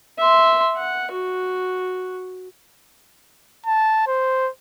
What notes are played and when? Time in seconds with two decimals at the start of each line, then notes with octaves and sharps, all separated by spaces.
0.18 E5 C6
0.76 F#5
1.11 F#4
3.66 A5
4.07 C5